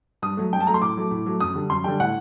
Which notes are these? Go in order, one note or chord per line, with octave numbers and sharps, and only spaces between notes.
G2 D#6
F#3 A3
G2 G5
A5
F#3 A3 A#5
C6
A2 D6
F#3 A3
A2
F#3 A3
F#2 D#6
D3 G3
F#2 C6
D3 G3 G5
A2 F#5